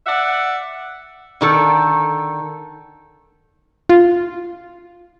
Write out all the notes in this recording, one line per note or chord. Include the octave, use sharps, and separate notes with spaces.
D5 E5 F#5
D3 D#3 A4
F4